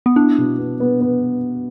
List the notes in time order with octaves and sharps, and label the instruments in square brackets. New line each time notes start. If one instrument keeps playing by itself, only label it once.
[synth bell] B3
[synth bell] D4 [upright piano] E4
[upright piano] B2
B3
B3
B3